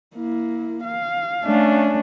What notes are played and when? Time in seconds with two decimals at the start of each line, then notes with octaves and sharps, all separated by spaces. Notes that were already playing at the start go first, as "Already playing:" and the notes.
0.16 A#3 E4
0.85 F5
1.45 A3 C#4 D4